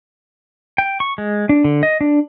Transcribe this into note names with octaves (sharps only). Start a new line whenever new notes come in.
G5
C#6
G#3
D4
D3
D#5
D4